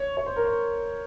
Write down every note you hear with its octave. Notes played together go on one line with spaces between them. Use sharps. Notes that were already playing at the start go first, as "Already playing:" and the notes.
Already playing: C#5
C#5
C5
A#4
C5